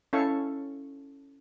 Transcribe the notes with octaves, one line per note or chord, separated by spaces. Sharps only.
C#4 E4 A4 F5 C#6